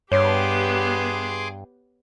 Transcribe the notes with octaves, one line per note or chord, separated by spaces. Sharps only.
G2 B3 G4 G#4 C#5 C6 D6